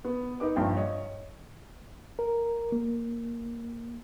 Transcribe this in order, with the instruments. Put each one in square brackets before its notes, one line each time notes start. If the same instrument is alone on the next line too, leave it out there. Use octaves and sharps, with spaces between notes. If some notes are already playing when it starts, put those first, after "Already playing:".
[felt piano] B3
D#4 B4 D6
A#1 G2 F4 G5
C#5 D#5
[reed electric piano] A#4
A#3